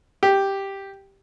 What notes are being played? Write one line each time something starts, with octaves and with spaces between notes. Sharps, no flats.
G4